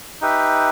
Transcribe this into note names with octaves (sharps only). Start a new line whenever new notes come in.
D#4 G4 B4 E5